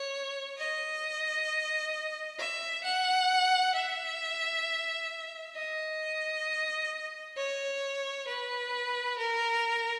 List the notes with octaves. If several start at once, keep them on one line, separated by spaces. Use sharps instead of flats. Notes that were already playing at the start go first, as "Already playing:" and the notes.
Already playing: C#5
D#5
E5
F#5
E5
D#5
C#5
B4
A#4